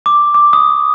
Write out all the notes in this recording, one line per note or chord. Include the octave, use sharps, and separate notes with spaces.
D6
D6
D#6